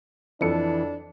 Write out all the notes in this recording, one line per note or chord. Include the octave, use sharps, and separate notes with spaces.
F2 E3 D4 A4 C#7